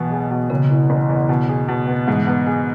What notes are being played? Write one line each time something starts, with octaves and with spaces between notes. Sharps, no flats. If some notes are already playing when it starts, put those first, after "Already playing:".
Already playing: B1 B2 E3 B3
G#4
B2
F#1 C#3
E3
F#1
E2
B2
G#4
B2
B3
G#2 E3
B3
G#4